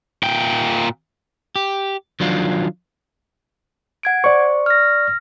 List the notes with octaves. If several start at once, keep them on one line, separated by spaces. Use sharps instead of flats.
A#2 G5
G4
D#3 F3 F#3 D4 F4
F#5 G#6 D7
C5 D5 C#6
F6 A#6